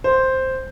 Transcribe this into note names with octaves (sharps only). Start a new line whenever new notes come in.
C5